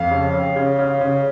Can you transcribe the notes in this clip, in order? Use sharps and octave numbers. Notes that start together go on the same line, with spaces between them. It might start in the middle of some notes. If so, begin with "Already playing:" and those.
Already playing: F2 F5
C#3
C#3
C#3
C#3
C#3